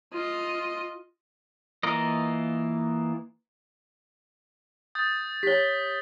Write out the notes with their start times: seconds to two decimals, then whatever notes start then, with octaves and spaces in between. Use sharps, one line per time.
0.13 F4 D#5
1.83 E3 A#3 F4 A#4 D#5
4.95 D#6 G6 A6
5.43 G4 C#5 B6 G7